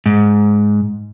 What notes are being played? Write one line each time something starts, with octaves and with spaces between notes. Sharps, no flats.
G#2